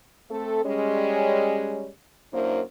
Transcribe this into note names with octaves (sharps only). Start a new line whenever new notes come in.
A3 C4 A4
G3 G#3 C#4
F#2 A#3 D4 E4 A#4 C5